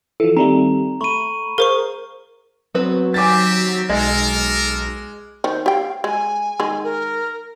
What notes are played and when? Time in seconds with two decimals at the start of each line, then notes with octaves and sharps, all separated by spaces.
0.20 E3 F3 A4
0.37 D#3 G3 A3 C4 A#5
1.01 A3 B5 C#6 D#7
1.58 G#4 A#4 C5 F5 C#6
2.75 F#3 B3 C4 B4
3.14 D#3 C4 G4 E5 G#5 D6 A6
3.90 B1 G#3 A4 A#4
5.44 D#3 C5
5.66 G4 F5 G5
6.04 G#3 G#5
6.60 D#3 G#3
6.84 A#4